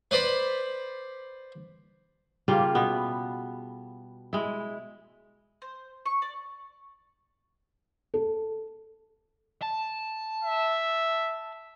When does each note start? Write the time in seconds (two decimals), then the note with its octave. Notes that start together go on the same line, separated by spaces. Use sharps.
0.11 B4 C5 D5 B5
2.48 C#3 G3 A#3 F4
2.75 B2 B3
4.33 G#3 E4
5.62 C5
6.06 C#6
6.22 D5
8.14 A4
9.63 A5
10.44 E5